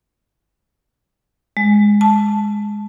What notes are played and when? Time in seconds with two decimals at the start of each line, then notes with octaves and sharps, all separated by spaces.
1.57 G#3
2.01 A5